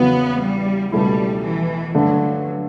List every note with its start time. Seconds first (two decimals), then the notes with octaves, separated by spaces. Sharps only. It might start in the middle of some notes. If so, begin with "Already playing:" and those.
Already playing: E2 C#3 F#3 B3
0.41 G3
0.92 C#2 B2 G3 A3 E4
1.43 E3
1.93 G2 D3 F#3 A3